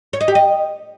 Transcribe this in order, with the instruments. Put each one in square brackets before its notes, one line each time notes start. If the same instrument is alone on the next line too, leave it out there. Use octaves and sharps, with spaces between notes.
[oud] C#5
D#5
G4
D#5